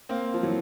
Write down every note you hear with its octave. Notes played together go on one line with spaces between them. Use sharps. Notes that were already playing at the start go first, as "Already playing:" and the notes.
A#3 C4
F3
E3 F#3